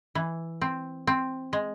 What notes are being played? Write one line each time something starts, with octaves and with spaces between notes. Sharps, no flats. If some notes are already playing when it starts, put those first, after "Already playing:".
E3
C4
C4
G#3